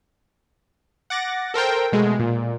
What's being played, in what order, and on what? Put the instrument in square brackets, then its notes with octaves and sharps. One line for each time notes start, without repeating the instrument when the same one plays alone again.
[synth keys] F#5 D6 A6 A#6
A4 A#4 C5 G5
B2 G#3 A3
A#2